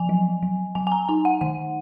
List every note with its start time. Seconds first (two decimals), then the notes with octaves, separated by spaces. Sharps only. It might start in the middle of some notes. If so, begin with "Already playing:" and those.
Already playing: F3 G#5
0.09 F#3
0.43 F#3
0.75 F#3 G#5
0.87 G#5
0.92 A#5
1.09 D#4 G#5
1.25 F#5
1.41 D#3 F#5